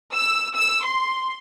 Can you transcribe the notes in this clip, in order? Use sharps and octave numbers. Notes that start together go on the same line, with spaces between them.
E6
E6
C6